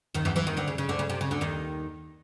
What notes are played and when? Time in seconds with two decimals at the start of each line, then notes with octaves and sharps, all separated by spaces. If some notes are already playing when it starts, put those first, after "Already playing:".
0.14 D#2 D#3
0.25 E2 E3
0.36 E2 E3
0.47 D#2 D#3
0.57 D2 D3
0.67 C#3
0.78 C#3
0.89 D2 D3
0.99 C#3
1.09 C3
1.21 C#3
1.31 D2 D3
1.41 D#2 D#3